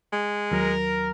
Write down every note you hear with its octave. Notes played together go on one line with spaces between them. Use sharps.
G#3
D#2 F#3 A#4